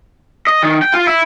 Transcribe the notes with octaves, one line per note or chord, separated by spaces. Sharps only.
D#5
D#3
G5
F4
E4